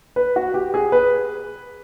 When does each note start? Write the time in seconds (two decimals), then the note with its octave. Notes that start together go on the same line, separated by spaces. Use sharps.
0.16 B4
0.36 F#4
0.54 G4
0.74 G#4
0.92 B4